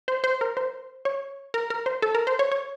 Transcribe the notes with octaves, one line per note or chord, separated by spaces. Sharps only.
C5
C5
A#4
C5
C#5
A#4
A#4
C5
A4
A#4
C5
C#5
C#5